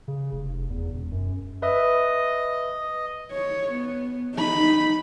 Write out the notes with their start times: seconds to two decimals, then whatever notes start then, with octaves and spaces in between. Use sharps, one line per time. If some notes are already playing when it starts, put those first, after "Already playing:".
0.08 C#3
0.32 F1
0.70 E2
0.93 E1
1.12 F#2
1.62 B4 D#5 E5
3.32 C#5
3.72 B3
4.35 D#4 B5